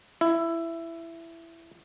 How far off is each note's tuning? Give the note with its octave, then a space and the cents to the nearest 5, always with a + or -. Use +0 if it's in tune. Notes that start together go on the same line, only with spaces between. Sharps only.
E4 +15